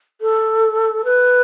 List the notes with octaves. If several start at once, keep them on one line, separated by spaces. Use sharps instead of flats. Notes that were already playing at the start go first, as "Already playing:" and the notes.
A4
B4